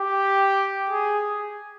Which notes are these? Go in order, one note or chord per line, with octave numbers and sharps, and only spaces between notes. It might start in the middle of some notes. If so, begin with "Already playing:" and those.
Already playing: G4
G#4